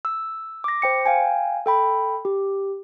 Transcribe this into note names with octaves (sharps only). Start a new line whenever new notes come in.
E6
D6 A#6
C5 G5 C#7
F5 G5 G#5
A4 G5 B5
G4